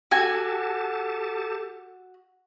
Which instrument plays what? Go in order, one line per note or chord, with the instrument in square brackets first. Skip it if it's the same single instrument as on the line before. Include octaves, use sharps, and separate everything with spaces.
[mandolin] F#4 G#5 [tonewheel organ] G4 A4 A5